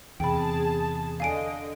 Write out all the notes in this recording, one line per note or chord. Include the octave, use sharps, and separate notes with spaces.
E2 C3 G#4 G5 A5 B5
D3 D#5 F5 G#5 D7